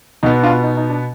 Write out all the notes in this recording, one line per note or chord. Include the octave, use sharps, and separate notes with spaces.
B2 B3 D#4
D4 F4
D#4
D#4
D4